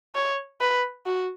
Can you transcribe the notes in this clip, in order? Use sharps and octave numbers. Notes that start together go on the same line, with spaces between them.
C#5
B4
F#4